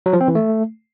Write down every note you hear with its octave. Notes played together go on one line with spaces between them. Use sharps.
F#3
F3
C4
E3
A3